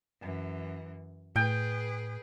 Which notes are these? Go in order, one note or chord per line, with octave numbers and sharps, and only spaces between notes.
F#2 E3
A2 G#4 B4 G5